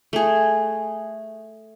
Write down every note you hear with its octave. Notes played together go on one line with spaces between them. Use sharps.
A3 G#4